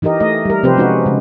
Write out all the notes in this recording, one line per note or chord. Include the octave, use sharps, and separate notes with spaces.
E3 D#4 G4 A#4 D#5
A3 D#5
G3 A#4
C3 F3 C4 G4 B4 C5
G#3 C#4 D#4 F#4 B4
C#3 G#3